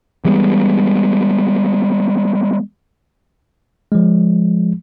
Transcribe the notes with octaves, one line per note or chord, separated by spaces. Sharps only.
E3 G3 G#3 B3
F3 G#3